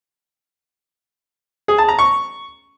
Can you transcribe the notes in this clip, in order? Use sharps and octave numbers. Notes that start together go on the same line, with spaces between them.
G#4
A5
A#5
C#6